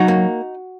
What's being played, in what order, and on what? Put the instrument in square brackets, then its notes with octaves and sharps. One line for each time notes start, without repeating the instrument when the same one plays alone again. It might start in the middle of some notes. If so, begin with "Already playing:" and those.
Already playing: [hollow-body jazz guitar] F#3 D#4 F#4
A#3